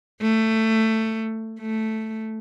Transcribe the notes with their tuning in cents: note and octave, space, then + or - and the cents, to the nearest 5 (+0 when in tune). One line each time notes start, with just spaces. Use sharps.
A3 +15
A3 +0